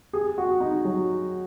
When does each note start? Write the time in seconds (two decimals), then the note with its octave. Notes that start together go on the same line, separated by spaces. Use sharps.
0.13 G#4
0.38 F#4
0.60 D#4
0.85 F#3